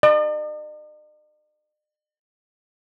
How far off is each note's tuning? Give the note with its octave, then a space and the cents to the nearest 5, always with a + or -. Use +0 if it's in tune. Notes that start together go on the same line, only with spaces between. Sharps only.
D#5 -45